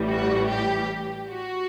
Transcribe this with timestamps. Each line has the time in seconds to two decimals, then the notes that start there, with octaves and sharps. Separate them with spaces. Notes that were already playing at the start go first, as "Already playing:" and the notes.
Already playing: A1 A2 E3 G3
0.08 F#4
0.49 G4
1.29 F#4